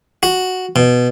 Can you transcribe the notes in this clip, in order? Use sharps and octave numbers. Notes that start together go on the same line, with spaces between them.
F#4
B2